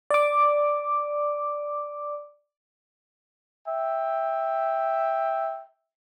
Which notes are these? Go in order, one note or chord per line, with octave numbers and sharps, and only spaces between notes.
D5 D6
E5 G5